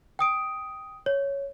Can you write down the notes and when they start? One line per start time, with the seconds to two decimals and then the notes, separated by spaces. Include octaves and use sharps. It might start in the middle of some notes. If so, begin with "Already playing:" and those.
0.19 G5 D#6 D7
1.06 C#5